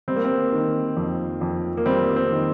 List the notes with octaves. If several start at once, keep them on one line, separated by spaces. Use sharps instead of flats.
G3 C4
A#3
C4
D#3
F2
F2
A#3
G3 C4
C4
D#3